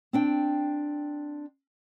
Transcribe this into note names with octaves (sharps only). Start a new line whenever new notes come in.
C4 D4 G5